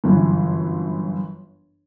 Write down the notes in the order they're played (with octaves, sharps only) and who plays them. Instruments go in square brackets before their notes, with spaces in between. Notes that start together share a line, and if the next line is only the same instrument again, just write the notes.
[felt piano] G1 F#2 E3